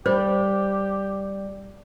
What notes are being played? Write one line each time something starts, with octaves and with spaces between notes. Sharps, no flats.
G3 G4 C5